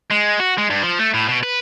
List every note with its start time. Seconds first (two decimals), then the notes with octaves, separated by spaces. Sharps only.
0.11 G#3
0.39 F#4
0.58 G#3
0.70 G2
0.83 F3
0.99 A3
1.14 A2
1.28 B2
1.43 B4